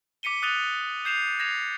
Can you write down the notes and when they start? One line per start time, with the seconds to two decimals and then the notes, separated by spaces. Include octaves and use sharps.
0.23 D6 B6 C#7 D#7 G7
0.42 D#6 F#6 A6 D#7 F7 G7
1.04 D#6 G6 C7 E7 F7
1.39 G#6 A#6 C7 E7 F7